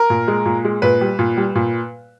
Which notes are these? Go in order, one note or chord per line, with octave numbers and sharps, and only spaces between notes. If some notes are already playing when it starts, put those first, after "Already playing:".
Already playing: A#4
A#2
G#3
A#2
G#3
A#2 B4
G3
A#2
G3
A#2